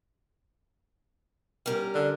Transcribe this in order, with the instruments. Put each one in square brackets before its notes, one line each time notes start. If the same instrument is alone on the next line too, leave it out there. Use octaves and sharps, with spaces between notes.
[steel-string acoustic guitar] G3 C#4 A#4
[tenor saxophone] D3